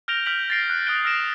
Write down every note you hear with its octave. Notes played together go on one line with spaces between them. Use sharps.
F6 G6 A#6 D7 F7 G7
F6 G6 B6 D7 F#7
A6 A#6 C7 D7
F#6
D#6 F#6 G6 A#6 D7 G7
E6 F6 A#6 C7 D7 E7